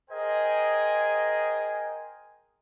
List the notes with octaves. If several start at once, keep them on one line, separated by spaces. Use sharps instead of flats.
G#4 A#4 C5 D#5 G5 G#5